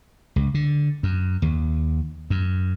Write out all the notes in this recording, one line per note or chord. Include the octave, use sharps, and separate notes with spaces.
C#2
D3
F#2
D#2
F#2